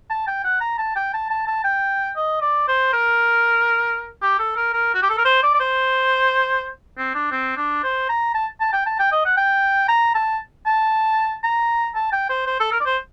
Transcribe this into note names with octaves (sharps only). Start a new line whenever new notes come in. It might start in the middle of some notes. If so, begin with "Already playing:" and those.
A5
G5
F#5
A#5
A5
G5
A5
A5
A5
G5
D#5
D5
C5
A#4
G4
A4
A#4
A#4
F#4
G4
A4
A#4
C5
D5
D5
C5
C4
D4
C4
D4
C5
A#5
A5
A5
G5
A5
G5
D#5
F#5
G5
A#5
A5
A5
A#5
A5
G5
C5
C5
A4
A#4
D5
C5